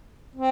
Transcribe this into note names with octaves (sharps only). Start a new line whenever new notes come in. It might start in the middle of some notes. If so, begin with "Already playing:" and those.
C4